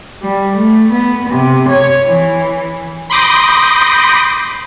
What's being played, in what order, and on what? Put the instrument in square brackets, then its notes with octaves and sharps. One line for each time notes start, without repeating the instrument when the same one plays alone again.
[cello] G3
A3
B3
C3
C#5
E3
[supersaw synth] B5 C6 D6 D#6 G6 A#6